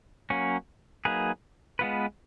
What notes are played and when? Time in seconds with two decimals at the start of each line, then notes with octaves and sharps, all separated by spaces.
0.30 F#3 A#3 C#4
1.05 F#3 A#3 D#4 G#4 B4
1.79 G#3 B3 F4 B4